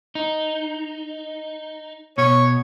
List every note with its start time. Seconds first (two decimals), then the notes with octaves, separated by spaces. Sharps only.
0.15 D#4
2.18 B2 C#5